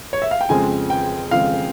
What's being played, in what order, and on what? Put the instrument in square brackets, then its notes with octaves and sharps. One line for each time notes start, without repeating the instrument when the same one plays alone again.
[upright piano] C#5
E5
F5
G5
F2 C#3 F3 G#3 C4 G#5
G5
F2 C#3 F3 G#3 C4 F5